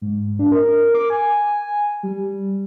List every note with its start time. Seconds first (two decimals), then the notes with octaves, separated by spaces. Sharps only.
0.02 G#2
0.39 D4
0.52 A#4
0.95 D6
1.10 G#5
2.03 G3